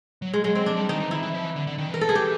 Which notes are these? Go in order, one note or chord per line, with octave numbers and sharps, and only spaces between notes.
F#3
G#3
F#3 G#3
F#3 C4
F3 D4
G3
D#3 D#4
E3
D#3 E4
E3
F3
E3
D3
D3
D#3
E3 A#4
A4
G#4
G4